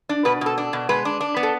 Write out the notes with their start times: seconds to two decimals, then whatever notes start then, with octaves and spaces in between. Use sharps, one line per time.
0.09 D4
0.25 B2 B4
0.41 B2 A4
0.58 D4
0.73 B2
0.89 G#3 B4
1.05 D4
1.21 D4
1.37 B3
1.43 A4